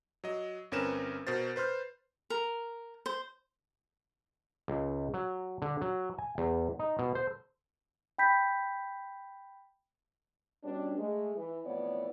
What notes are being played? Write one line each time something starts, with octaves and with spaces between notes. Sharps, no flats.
F#3 D#5
G1 C4 C#4 A#4 B4 E7
B2 A#4 C5 A6
B4 C5 C6 F6 G6
A#4
C5
C#2
F#3
D3
F#3
G#5
E2
D#4
B2
C5
G5 B5 G6 B6
B2 G3 C#4 D4
G#3 A3
E3
F2 A2 E3 B3 C#5 D5